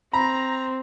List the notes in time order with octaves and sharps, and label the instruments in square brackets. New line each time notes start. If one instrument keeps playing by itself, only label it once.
[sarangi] C4 [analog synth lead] A#5 [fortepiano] B5